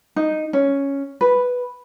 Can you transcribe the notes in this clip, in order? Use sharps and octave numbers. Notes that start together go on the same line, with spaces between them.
D#4
C#4
B4